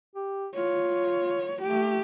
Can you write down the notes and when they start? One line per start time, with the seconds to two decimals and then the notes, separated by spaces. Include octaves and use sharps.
0.16 G4
0.55 F4 C#5
1.63 A3 G4